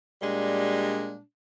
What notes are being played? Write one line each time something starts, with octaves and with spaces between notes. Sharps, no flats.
A#2 G3 G#3 D4